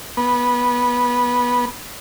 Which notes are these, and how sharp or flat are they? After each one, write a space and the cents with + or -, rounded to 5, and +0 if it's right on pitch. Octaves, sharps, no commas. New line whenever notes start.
B3 -15